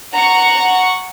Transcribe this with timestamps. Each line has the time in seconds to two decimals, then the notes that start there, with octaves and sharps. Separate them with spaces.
0.14 F#5 A#5 C#6